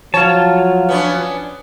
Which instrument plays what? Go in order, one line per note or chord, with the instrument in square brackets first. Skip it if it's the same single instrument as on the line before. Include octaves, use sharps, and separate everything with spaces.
[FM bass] F3 [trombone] F#3 [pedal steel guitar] F4 A5 [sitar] C#5
[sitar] B3 C#4 D4